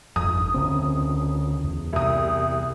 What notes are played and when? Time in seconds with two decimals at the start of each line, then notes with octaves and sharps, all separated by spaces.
0.16 G1 F2 D#6
0.54 D2 C#3 C4
1.64 E2
1.93 C2 D#6